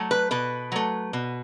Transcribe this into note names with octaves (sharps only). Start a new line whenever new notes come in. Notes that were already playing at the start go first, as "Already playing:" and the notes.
Already playing: F#3 A3
B4
B2 B4
F#3 A3
B2